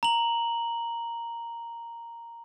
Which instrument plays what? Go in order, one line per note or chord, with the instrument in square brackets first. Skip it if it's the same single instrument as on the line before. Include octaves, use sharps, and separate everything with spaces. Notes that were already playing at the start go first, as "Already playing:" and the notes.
[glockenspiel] A#5 F#7